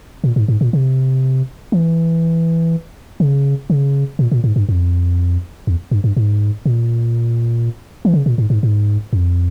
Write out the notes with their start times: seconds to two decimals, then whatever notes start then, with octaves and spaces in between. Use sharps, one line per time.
0.24 A#2
0.36 G#2
0.48 G#2
0.61 A#2
0.73 C3
1.72 E3
3.20 C#3
3.70 C#3
4.19 A#2
4.32 A#2
4.44 G#2
4.56 G2
4.69 F2
5.67 E2
5.91 G2
6.04 G2
6.16 G#2
6.66 A#2
8.05 E3
8.14 C#3
8.26 A#2
8.38 G#2
8.50 G#2
8.63 G#2
9.13 F2